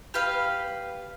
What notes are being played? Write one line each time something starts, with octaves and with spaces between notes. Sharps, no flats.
G4 B4 F5